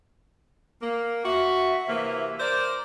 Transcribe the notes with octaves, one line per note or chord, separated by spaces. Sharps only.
A#3
F#4 E5
C3 E3 A#3
A#4 C5 D5